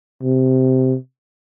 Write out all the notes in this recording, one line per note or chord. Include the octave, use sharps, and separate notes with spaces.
C3